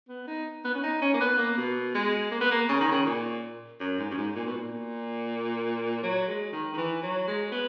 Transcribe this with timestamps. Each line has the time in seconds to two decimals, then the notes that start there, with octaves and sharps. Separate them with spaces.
0.09 B3
0.27 D#4
0.65 B3
0.75 C#4
0.83 D#4
1.02 C#4
1.14 A#3
1.21 B3
1.38 A#3
1.58 B2
1.95 G#3
2.32 A#3
2.41 B3
2.51 A#3
2.69 C#3
2.80 D#3
2.92 C#3
3.06 A#2
3.80 F#2
3.99 G#2
4.11 F#2
4.18 G#2
4.36 A#2
4.47 B2
4.57 A#2
6.03 F#3
6.28 G#3
6.53 D#3
6.74 D#3
6.78 E3
7.03 F#3
7.28 G#3
7.52 B3